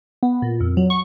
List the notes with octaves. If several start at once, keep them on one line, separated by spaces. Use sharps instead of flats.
B3
A#2
F2
F#3
C#6